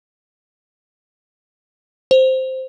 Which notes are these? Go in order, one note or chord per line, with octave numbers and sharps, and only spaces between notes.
C5